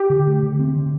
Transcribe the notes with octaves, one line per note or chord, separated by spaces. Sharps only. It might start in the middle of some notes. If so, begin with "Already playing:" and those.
Already playing: G4
D3
A3
D3
C4
D3